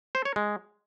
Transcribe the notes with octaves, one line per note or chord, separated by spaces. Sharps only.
C5
C#5
G#3